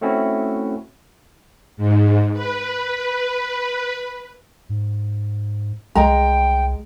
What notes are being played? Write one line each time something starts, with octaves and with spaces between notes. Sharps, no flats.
A3 C4 C#4 E4 F#4
G#2
B4
G#2
C2 G#3 G5 A#5